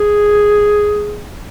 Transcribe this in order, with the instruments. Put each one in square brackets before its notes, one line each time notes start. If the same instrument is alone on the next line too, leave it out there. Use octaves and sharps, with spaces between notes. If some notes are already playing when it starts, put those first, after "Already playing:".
Already playing: [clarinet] G#4